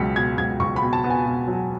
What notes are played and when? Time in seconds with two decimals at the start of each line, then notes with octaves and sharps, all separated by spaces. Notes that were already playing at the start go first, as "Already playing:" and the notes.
Already playing: C#2 B2 F#3 B6 C#7
0.16 B2 G#6
0.38 C#2 G#6
0.60 C#2 C#6
0.76 B5
0.82 B2
0.93 A5
1.04 B3
1.10 G#5
1.26 B2
1.48 F#3